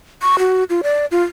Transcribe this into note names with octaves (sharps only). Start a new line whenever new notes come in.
C#6
F#4
F4
D5
F4